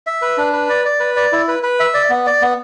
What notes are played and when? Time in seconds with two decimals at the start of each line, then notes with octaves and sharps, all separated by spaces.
0.07 E5
0.22 B4
0.38 D4
0.53 B4
0.69 D5
0.85 D5
1.00 B4
1.16 D5
1.32 E4
1.48 B4
1.63 B4
1.80 E5
1.94 D5
2.10 B3
2.27 D5
2.42 B3